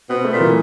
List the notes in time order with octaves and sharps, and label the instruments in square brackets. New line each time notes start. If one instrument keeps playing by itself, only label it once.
[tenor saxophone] B2 [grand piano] C4
[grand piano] A3
[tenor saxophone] A#2
[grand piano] E3